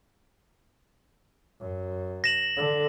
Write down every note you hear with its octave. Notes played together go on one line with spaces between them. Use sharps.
F#2
A#6 E7 F#7
D3